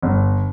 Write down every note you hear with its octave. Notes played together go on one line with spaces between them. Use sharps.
G1